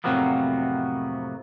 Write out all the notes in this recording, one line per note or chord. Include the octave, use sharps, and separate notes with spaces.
F2 A2 C3 F#3 A#3 B3